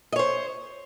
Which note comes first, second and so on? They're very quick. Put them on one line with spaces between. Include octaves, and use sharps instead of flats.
D#5 C#5 C5